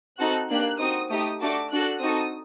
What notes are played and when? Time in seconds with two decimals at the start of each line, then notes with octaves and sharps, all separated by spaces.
0.19 C4 D#4 F#4 A4 F#6
0.50 A#3 D4 G4 F#6
0.80 C4 D#4 F#4 D#6
1.10 A3 D#4 G4 D#6
1.40 A3 D4 F#4 A4 D6
1.71 D4 F#4 A4 F#6
2.01 C4 D#4 F#4 A4 D#6